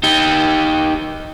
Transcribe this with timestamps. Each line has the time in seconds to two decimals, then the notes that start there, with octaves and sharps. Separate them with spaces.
0.03 D#4 G4